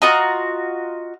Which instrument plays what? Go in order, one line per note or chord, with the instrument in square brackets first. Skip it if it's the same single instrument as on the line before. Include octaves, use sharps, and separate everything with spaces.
[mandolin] F4 F#4 D#5 A#5